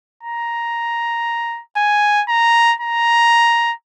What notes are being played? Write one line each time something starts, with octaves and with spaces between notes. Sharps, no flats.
A#5
G#5
A#5
A#5